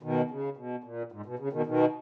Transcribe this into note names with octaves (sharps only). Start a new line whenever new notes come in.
B2 D#3
C#3
B2
A#2
G#2
B2
C#3
B2 D#3
B2 D#3